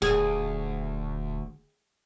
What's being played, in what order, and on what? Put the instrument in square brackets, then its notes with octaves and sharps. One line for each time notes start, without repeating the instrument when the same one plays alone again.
[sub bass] D#1 [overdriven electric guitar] D2 [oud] G#4